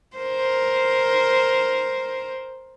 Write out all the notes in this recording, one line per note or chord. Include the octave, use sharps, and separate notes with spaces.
A#4 C5